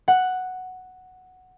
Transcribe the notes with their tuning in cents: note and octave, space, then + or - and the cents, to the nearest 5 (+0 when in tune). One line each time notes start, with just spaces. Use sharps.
F#5 +0